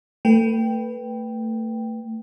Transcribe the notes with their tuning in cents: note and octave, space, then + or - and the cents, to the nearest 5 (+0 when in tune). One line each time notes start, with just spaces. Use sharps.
A3 +30 B4 -5 G5 +0